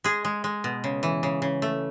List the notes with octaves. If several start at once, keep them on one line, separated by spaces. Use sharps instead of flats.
G#3 G#4
G#3
G#3
B2
C#3
E3
C#3
C#3
A3